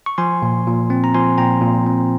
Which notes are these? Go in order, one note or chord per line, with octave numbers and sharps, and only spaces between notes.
C#6
F3 G#5 C6
A#2
A#2
C4
A#5
F3 G#5 C6
A#2 G5 A#5
A#2
C4